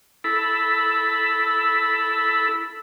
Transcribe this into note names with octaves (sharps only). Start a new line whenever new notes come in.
E4 A4 B5